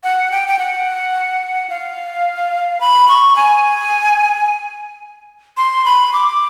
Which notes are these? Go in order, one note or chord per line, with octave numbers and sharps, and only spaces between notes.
F#5
G5
G5
F#5
F5
B5
C#6
G#5
C6
B5
D6